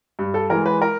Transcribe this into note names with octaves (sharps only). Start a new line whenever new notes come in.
G2
A4
E3 G#3 A#4
B4
A#4